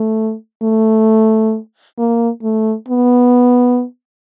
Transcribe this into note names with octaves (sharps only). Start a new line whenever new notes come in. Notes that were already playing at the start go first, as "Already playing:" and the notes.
Already playing: A3
A3
A#3
A3
B3